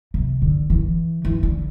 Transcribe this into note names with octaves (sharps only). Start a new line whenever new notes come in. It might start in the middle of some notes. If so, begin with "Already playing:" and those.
C3
D3
E3
E3
D3